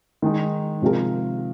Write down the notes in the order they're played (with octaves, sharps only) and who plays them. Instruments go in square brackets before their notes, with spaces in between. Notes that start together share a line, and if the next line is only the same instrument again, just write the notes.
[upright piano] D#3 G#3 D#4
C3 F3 G#3 F4 A#4